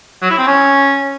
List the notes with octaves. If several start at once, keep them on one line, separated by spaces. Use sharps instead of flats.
F#3
E4
C4
C#4